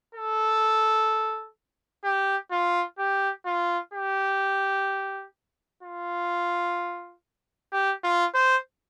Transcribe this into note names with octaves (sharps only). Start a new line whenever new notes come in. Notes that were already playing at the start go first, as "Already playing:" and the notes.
A4
G4
F4
G4
F4
G4
F4
G4
F4
C5